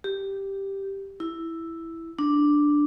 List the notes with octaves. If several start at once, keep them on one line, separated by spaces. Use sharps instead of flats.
G4
E4
D4